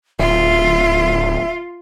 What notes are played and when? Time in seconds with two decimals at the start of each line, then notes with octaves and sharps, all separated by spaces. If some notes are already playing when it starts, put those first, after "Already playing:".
0.19 D1 F4 E5